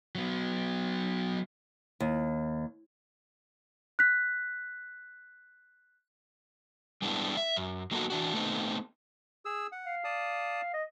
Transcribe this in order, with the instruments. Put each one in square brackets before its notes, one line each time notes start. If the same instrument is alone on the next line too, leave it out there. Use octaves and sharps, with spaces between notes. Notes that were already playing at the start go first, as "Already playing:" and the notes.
[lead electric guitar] F#3 B3
[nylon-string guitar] D#2
[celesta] F#6 B6
[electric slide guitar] G3 G#3 B3 D4 E4
E5
F#2
F#3 A#3 B3 D#4 F#4 A4
E3 D4 F#4
A3 B3 C4 D#4
[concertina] G#4 E6
F#5
[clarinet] F5
[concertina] D5 A5 D#6
[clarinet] D#5